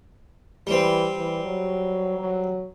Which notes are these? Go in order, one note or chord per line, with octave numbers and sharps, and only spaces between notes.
E3 G3 C4
E3
F#3
F#3